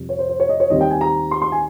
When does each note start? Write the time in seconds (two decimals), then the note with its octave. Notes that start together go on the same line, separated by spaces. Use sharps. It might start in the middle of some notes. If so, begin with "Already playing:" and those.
Already playing: F2 C3 G3 C4
0.09 C#5
0.19 C5
0.29 C5
0.40 C#5
0.49 D#5
0.60 C#5
0.70 D#2 D#3 G3 C4 D#5
0.81 G5
0.91 G#5
1.01 A#5
1.31 C6
1.42 C6
1.52 G#5